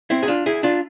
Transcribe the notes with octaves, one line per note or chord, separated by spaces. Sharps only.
C4 E4
G#4
D4 F4
E4 G#4
D4 F4